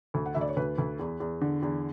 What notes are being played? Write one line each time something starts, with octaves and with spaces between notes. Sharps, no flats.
D2
F#5
D2 E5
D5
C#5
D2 B4
D2
E2
E2
D3
E2